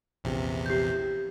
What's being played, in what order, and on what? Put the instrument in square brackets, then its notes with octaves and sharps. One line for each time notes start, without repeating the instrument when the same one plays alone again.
[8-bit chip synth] A#1 E2 C3
[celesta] G4 G6